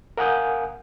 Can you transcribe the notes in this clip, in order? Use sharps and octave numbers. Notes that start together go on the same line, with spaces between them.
A#4 F5 F#5 G#5 D#6 G6